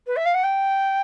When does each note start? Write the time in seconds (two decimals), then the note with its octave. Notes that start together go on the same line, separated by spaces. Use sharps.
0.07 B4
0.16 E5
0.25 F5
0.34 F#5
0.43 G5